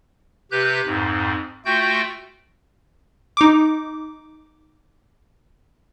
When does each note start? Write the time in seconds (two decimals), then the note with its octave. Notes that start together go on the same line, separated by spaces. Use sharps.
0.51 C3 G4 B4 F#6 G6
0.86 F2 G#2
1.65 A3 F4 F#4 G5 G6
3.37 D#4 D6